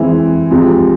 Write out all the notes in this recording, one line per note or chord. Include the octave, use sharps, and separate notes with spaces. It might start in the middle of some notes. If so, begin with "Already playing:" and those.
Already playing: E3 G#3 C4 E4
C2 C3 F3 G#3